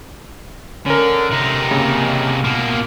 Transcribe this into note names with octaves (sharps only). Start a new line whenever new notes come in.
D3 C#4 A#4
C3 D#4
C#3 A#3
B2 A#3